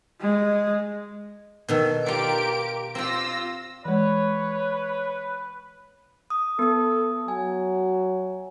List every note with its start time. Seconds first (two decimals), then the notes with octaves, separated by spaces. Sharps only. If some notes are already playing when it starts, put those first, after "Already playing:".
0.21 G#3
1.68 B2 D#3 A4
2.06 F4 G4 A#4 D5 D7
2.95 C4 F4 G4 E6 A#6
3.85 E3 G#3 B4 C#5
6.30 D#6
6.59 B3 A4 D#6
7.28 F#3 G#5